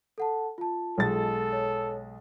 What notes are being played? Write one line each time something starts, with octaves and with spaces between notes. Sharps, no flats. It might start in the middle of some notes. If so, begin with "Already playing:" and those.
A4 F#5 A5
F4 A5
B1 G#3 A4 A6
C#5